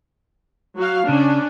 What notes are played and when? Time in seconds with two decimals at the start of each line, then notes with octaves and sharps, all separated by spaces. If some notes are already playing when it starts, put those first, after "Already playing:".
0.76 F#3 F#4 F5
1.08 C#3 C#4 D4